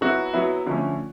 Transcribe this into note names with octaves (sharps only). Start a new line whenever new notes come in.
F#3 B3 E4 F#4
F#3 B3 E4
D3 F3 A3 C#4